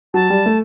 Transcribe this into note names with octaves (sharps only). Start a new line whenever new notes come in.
F#3 A5
G3
A3